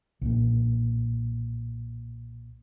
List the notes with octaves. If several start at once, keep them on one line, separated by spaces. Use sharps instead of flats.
B1 A#2